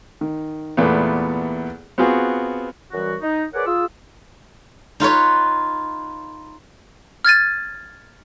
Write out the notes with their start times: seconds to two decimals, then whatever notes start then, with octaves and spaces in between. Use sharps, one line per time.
0.21 D#3
0.77 E2 A#2 A3 B3
1.98 B3 C4 F4 F#4 G#4
2.92 F#2 E3 G3 F#4
3.22 D#4
3.54 G#4 A#4 B4 C#5 D5 F#5
3.66 F4 G#4 E6
5.00 D#4 F4 B4 C#5
7.25 F6 G#6 A6 D#7